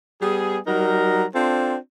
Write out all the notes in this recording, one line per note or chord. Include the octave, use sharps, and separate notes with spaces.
G3 B3 G#4
F#3 G3 D#4 A#4
C4 D4 F4 A4 C5